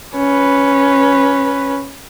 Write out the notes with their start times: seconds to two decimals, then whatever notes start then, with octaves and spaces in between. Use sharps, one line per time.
0.16 C#4 B4